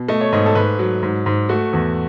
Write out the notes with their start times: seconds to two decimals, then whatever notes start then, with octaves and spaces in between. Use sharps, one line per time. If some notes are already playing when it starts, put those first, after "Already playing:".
Already playing: B2
0.09 A3 D#5
0.21 C#5
0.32 G#2 D#5
0.46 A4
0.55 G#2 B4
0.79 F#3
1.03 G#2
1.26 G#2
1.49 A3 F#4
1.73 E2